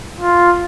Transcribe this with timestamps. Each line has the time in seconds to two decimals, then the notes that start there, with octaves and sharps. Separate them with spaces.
0.20 F4